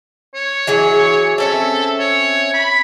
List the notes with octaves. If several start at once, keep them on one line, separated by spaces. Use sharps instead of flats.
C#5
E3 F#3 G#4
C4 C#4 A4 E5
C#5
B5